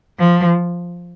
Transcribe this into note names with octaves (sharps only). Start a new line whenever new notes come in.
F3